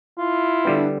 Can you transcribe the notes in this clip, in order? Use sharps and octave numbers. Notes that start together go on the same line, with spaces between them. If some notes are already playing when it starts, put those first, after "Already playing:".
E4 F4
D3 G3 B3 D4